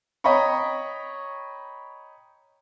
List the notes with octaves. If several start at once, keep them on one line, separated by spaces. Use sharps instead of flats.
C#5 D#5 G5 A#5 B5 C#6